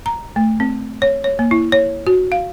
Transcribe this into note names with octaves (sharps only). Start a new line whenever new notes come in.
A#5
A3
C4
C#5
C#5
A#3
E4
C#5
F#4
F5